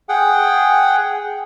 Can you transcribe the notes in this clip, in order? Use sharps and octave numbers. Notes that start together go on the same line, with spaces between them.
G#4 F#5 G5